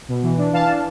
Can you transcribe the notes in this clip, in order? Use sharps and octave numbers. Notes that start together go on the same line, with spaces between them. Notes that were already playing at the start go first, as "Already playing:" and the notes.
B2
E3
D4
E3 F5 A5
D4